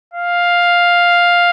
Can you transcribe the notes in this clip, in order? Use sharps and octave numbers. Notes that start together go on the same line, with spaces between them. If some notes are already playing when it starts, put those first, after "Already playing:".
F5